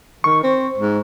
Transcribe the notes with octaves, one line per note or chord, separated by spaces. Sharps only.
D#3 C#6
C4
G#2